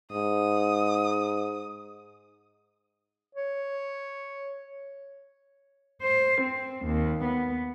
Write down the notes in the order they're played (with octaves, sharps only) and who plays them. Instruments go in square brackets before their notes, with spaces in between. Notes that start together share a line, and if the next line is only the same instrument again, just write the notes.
[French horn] G#2 [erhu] D#6
[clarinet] C#5
[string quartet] C5
C4
D#2
B3